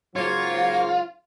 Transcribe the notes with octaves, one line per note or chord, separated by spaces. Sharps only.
G#2 C#3 F#3 A#3 F4 C5 C#5